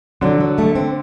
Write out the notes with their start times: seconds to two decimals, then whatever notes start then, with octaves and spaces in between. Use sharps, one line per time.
0.21 D3 F#3
0.40 F#3
0.58 A3
0.75 C4